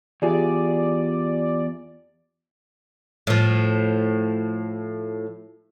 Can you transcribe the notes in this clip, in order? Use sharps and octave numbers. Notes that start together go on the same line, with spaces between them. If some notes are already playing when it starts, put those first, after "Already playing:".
E2 F4 G4 G#4 D5
A2 F3